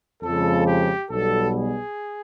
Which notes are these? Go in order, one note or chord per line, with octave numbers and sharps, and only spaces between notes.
F2 C#3 F3 G#3 A4
G4
B1 B2 G3 B3 A4
G#4